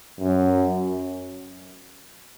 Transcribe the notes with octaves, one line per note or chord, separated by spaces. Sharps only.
F#2